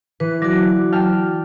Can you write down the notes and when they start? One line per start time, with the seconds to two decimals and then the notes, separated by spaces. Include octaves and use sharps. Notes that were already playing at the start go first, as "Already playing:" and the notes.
0.20 E3 B4
0.42 F#3 F#4 D5
0.93 G5 A5 F6